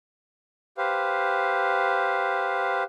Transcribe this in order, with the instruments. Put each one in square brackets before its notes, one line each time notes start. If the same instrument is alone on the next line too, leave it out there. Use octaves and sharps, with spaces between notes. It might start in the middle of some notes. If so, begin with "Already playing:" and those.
[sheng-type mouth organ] G4 B4 C5 F5